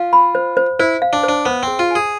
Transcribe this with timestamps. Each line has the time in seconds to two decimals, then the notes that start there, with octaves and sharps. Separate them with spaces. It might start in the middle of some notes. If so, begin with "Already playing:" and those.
Already playing: F4 F5
0.13 B5
0.35 C5
0.57 C5
0.79 E4 C5
1.02 F5
1.13 D4
1.23 C5
1.29 D4
1.45 B3 C5
1.63 C4 G#4
1.79 F4
1.91 G#4 G#5